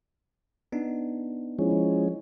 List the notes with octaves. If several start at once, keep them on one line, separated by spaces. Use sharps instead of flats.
B3 D4 D#4
F3 G#3 C#4 E4